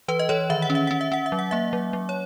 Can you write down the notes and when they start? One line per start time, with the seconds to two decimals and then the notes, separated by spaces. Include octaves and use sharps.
0.08 E3 B4
0.19 D#5
0.29 E3 C#5
0.50 D#3 E5
0.62 F#5
0.70 C#4
0.75 E5
0.87 C#4 F#5
1.01 E5
1.12 C#4 F#5
1.26 E5
1.32 F#3
1.39 F#5
1.51 A#3 E5
1.73 F#3
1.93 F#3
2.09 C#5